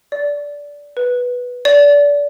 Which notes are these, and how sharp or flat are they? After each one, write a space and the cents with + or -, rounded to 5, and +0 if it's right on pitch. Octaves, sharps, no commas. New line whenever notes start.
D5 -15
B4 -5
D5 -25